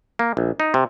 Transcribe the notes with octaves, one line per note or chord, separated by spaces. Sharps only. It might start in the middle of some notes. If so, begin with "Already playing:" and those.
A#3
A#1
D#4
C3